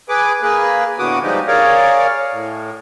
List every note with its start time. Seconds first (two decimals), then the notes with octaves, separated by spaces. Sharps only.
0.09 G#4 B4 D6
0.42 A#3 G#4 B4
0.99 A2 D3 B3 F#4 D6 D#6
1.23 F3 G3 G#3 D#4 G4
1.48 G#4 A#4 C#5 D5 F5
2.32 A2